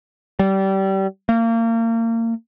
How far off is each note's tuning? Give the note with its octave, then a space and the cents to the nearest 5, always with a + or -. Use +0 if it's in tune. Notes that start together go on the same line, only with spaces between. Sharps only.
G3 -25
A#3 -30